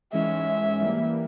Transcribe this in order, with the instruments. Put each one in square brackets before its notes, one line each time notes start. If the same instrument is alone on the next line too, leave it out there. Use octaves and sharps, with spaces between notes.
[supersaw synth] G#2 E3 G#3 C#4 [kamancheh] E5
[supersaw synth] E3 G3 A#3